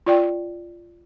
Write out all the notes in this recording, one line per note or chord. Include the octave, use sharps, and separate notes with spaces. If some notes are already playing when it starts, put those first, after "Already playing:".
F4 D5 G5